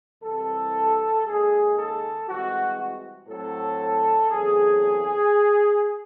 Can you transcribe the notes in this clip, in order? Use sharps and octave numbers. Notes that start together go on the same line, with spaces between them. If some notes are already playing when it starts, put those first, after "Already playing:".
C2 C3 E3 A4
D#2 C#3 G#3 G#4
A4
C2 C3 E3 G#3 F#4
A2 F#3 C4 A4
E2 C3 F#3 A3 G#4